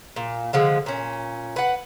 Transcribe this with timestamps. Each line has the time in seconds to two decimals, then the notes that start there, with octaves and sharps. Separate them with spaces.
0.16 A#2
0.53 D3 F3 G#3
0.86 A#2 C#4
1.56 B4 F#5